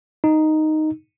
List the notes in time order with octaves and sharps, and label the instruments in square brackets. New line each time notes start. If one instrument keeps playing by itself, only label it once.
[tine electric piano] D#4